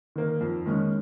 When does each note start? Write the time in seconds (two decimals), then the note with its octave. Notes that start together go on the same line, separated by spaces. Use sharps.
0.16 D#3 A#3
0.41 F2
0.66 D#3 G#3 C#4